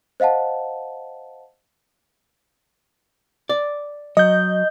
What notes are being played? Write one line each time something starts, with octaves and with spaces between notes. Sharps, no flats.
C5 D#5 F5 F#5 A5
D5
F#3 D#5 G6